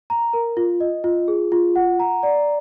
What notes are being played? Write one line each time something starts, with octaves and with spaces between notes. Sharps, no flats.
A#5
A#4
F4
D#5
F4
G#4
F4
F#5
A#5
D5